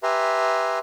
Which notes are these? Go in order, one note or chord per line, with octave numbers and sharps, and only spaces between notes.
G4 B4 E5 G#5 A#5 C6